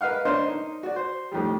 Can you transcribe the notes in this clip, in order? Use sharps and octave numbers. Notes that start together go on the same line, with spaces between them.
A#4 B4 D#5 F5 F#5
D4 A#4 C5 C#5 D#5
D#4
F#4 D5
C5
F2 A2 D#3 G3